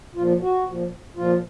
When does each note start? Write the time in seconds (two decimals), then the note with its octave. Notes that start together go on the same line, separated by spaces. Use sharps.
0.15 A#2 F3 F4
0.41 F#4
0.66 A#2 F3
1.16 A#2 F3 F4